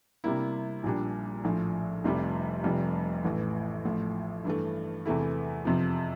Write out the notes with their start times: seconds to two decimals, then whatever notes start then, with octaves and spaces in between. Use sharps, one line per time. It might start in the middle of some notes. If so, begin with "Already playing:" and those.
0.24 C3 G3 A#3 E4
0.83 A#1 A#2 G3 D4
1.44 A#1 A2 F3
2.04 F1 F2 C3 G3
2.64 F1 F2 C3 G3
3.24 A1 A2 E3
3.85 A1 A2 F3
4.45 G2 E3 A3
5.05 E2 C3 E3 A3 E4
5.65 F2 C3 F3